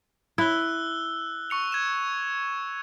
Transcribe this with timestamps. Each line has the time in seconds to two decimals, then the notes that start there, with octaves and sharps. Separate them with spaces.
0.38 E4 E6 F#6 G7
1.50 C#6 C#7 F7
1.72 G#6 E7